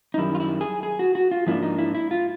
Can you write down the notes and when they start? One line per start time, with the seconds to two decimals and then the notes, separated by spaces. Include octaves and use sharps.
0.14 D#4
0.18 F#2 D#3 G3 E4
0.35 F4
0.40 E4
0.61 G#4
0.83 G#4
0.99 F#4
1.15 F#4
1.31 F4
1.47 G#2 F3 A#3 D4 E4
1.63 D#4
1.79 E4
1.95 E4
2.11 F4